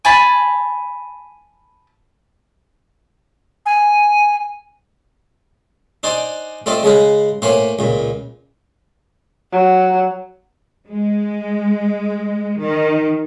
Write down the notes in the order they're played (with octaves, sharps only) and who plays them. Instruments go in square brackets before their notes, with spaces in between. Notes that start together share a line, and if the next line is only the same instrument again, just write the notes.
[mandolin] G#5 A5 B5
[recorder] G#5
[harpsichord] D4 D#4 C5 D5 G#5
A3 C4 F4 D5 D#5
C#3 G#3 G#4 B4
A2 A#3 C5 C#5 G#5
C#2 A#2
[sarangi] F#3
[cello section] G#3
D#3